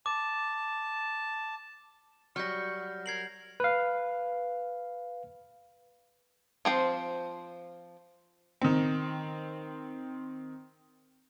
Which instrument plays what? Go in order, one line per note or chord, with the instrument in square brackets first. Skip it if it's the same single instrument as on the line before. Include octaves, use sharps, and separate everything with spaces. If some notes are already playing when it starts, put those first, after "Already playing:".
[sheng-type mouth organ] A5 [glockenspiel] D6
[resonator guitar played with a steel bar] F#3 G3 [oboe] C#6 [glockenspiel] F6 G6 A#6
[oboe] A#4 [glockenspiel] G#6 C7 F#7
[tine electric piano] B4 F5
[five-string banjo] F3 C4 C5
[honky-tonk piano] D#3 C4